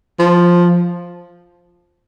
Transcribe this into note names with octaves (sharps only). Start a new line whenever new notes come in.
F3